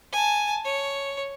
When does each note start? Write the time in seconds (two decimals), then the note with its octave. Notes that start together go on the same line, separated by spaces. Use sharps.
0.13 G#5 A5
0.65 C#5